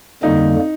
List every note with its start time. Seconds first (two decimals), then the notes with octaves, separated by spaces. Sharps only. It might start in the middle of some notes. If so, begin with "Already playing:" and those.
0.23 F2 D3 G3 A#3 D#4